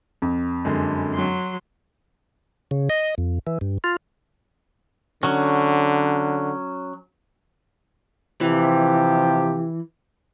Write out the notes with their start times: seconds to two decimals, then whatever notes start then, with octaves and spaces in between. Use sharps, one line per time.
0.22 F2
0.65 F#2 D3 G#3
1.14 F#3 C6
2.71 C#3
2.90 D#5
3.18 F2
3.47 E3
3.61 G2
3.84 F4
5.23 D3 F#3 C#4
8.41 C3 E3 F3 G4